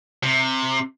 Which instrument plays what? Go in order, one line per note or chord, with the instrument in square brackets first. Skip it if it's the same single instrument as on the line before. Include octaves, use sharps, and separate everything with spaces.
[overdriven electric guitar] C3